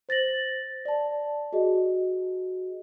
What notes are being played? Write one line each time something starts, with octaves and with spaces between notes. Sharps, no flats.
C5 A6 A#6 F#7
D5 A5
F#4 G#4 D#5